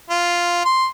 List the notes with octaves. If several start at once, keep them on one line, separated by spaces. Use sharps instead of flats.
F4
C6